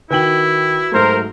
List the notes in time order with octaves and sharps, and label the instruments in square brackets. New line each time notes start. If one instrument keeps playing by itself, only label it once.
[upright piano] D#3 G5 F#7 [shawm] E4 [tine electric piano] F#4 B4
[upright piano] G#2 F#3 A3 [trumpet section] A#4 C5